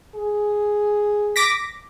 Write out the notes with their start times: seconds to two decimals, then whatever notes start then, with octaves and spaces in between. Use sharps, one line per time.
0.15 G#4
1.36 D6 A#6 B6